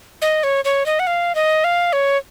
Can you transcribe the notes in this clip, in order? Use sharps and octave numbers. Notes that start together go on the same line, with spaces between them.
D#5
C#5
C#5
D#5
F#5
F5
D#5
F5
C#5